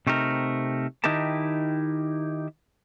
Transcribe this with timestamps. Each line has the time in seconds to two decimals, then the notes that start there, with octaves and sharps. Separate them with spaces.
0.07 C3 A3 C4 D#4 A#4
1.04 D#3 D#4 E4 G4 A#4 A5